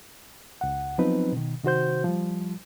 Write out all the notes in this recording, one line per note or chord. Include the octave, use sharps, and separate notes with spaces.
C#2 F#5
F3 F#3 B3 C4 D#4 B4
B2 D#3
C3 D#3 F#4 C5 G6
F3 G3